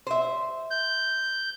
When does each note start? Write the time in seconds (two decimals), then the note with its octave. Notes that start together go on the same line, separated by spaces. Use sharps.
0.07 C5 E5
0.71 G6